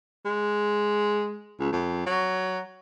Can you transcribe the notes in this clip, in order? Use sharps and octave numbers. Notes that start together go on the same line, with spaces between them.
G#3
C#2
F2
F#3